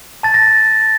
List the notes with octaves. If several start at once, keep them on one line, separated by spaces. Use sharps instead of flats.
A5 A6
A#6